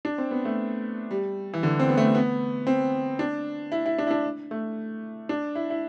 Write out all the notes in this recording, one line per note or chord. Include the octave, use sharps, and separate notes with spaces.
D4
C4
B3
A3
G3
E3
D3
C4
B3
A3
B3
C4
D4
E4
E4
D4
E4
D4
A3
D4
E4
E4